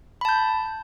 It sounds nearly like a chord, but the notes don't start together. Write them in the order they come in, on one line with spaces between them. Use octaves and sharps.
B5 A5 G6